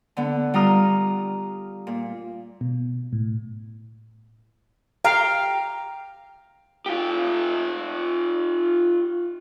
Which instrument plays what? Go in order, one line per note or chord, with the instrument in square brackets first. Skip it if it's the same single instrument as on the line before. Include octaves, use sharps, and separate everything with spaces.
[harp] D3 B3
G3 F4 A#5 D#6 F6
A#2
[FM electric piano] B2
A2
[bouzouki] G4 G5 A#5 [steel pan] F5
[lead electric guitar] F4 G4